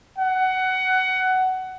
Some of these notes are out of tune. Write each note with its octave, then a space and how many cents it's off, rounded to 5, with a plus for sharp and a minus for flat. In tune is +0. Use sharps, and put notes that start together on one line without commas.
F#5 +15